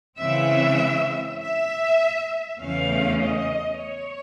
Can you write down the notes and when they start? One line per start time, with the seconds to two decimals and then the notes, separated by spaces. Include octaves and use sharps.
0.18 C#3 E3 G#3 C4 E5
1.39 E5
2.59 E2 C#3 E3 A3 C#4 F5
3.20 D#5
3.81 C#5